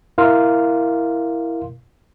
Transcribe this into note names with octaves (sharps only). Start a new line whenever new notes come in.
E4 A#4 F5 C6